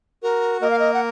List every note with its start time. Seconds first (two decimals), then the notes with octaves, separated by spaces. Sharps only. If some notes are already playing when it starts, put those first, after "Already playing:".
0.23 F#4 A#4
0.61 A#3 A#4 D#5
0.70 F5
0.79 D#5
0.94 F#5